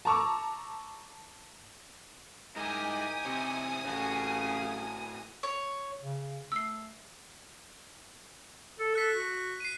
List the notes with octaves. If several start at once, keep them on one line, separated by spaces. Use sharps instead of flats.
A5 A#5 C#6 D6 E6
G#2 D#4 E4 G4 A#4 G#5 D#6
C3 C4 E4 C#5
A1 A2 C#3 F#4
C#5
C#3
A3 E6 C7
A4
A4 F#6 B6
F#4
C7 D#7